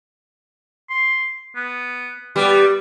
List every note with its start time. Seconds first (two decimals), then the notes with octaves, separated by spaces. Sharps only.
0.90 C6
1.56 B3
2.36 G3 B3 D5